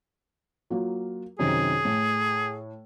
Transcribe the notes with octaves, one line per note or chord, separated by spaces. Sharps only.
F#3 A#3 F4
F#2 C3 D#3 G#4
A2